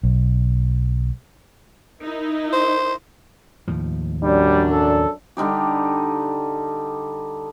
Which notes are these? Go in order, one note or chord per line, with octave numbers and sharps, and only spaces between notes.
B1
D#4 E4 A#4
C5
D#2 A2 F3
F#2 F#3 G3 D4
A4
D3 G3 D#4 G4